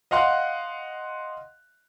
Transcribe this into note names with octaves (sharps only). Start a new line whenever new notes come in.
D#5 F5 F#5 C6 F#6